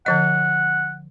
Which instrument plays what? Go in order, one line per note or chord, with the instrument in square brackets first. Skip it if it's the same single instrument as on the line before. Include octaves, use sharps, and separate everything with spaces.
[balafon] D3 F3 D#5 [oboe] F#5